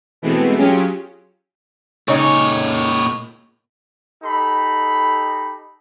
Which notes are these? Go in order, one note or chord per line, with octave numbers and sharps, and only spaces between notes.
B2 E3 G#3 A3 B3 C4
F#3 C#4 F4 G4 G#4
A#2 C#3 C#4 D#4 C#5
D#4 G4 A4 B5